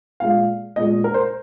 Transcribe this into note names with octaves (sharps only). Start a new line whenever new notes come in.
A#2 G#3 F5
A#2 G#3 D#5
A#4
C5